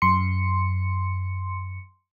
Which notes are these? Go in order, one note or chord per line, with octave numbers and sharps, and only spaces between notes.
F#2 C6 C#7